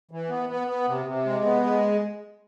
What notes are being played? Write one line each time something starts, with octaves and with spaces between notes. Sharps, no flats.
E3
B3
B3
B3
C3
C3
G#3
B3
G#3